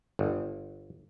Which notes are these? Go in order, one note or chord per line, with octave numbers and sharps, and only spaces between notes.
G1